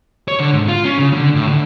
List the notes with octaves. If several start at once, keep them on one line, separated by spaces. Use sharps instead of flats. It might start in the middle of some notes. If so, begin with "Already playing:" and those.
C#5
D3
G#2
F4
C#4
C#3
D3
A2
D3